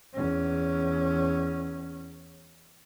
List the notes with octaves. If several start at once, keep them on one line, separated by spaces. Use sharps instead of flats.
E2 C#4